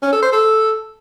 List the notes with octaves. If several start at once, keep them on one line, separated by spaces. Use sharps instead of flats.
C#4
A4
C5
A4